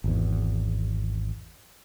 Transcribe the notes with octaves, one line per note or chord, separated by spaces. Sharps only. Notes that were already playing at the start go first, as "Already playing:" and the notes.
G#1 E2